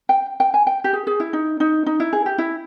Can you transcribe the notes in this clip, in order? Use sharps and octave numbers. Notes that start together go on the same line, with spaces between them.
G5
G5
G#5
G5
G4
G#4
G#4
E4
D#4
D#4
D#4
E4
G#4
G4
E4